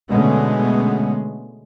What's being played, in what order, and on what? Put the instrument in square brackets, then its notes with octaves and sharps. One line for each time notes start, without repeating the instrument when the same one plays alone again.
[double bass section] B2 D3 G#3 A3 B3 C#4